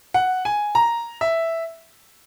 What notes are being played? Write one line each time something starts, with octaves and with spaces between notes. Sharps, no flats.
F#5
G#5
A#5
E5